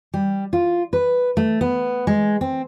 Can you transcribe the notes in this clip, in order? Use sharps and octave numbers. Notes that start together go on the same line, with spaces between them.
G3
F4
B4
A3
B3
G#3
C4